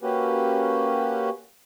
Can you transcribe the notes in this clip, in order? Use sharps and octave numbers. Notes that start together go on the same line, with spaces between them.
A#3 C#4 F#4 G4 B4